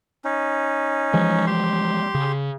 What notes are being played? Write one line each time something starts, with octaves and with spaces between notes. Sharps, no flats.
C#4 D#4
E3 F3 G#3
G4 C6
C#3